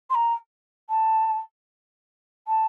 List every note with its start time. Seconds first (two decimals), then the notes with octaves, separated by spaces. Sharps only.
0.10 C6
0.15 A#5
0.89 A5
2.47 A5